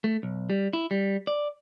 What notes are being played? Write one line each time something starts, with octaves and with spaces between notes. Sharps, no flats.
A3
B1
G3
E4
G3
D5